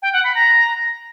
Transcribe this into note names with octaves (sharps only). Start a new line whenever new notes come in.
G5
F#5
B5
A#5